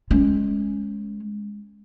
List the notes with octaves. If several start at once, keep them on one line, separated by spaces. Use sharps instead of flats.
G#3 C#4